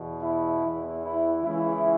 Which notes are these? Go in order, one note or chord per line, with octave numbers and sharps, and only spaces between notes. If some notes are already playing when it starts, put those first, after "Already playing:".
Already playing: E2 B2
E4
E2 E3
E4
C#2 C#3 E3 E4